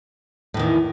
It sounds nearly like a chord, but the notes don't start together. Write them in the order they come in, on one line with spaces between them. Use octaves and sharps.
A2 E2 D#3